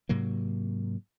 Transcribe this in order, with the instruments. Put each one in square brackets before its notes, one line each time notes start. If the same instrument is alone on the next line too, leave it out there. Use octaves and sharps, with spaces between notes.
[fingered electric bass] G#2 C3 F#3 A#3